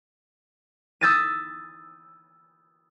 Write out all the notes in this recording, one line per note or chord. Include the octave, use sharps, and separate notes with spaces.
D#6 E6 G6 A6 B6 D#7